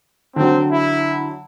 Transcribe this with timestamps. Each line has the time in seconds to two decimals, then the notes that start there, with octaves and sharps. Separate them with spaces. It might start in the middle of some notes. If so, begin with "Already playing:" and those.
0.36 D3 F#3 C4
0.72 E4